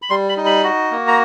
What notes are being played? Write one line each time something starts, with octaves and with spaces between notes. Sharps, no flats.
B5
G3 C6
B5
D#4
B5
F#4
A#3
A#5